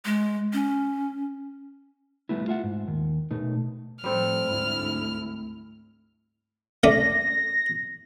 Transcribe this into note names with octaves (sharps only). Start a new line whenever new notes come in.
G#3
C#4
G3 A3 B3 E4
F4 E5 F#5
G#2
D#2
B2 A3 D#4
A2 F3 G3 C4 A4 F6
D2 G#2 E4
A3 C#4 D5 A#6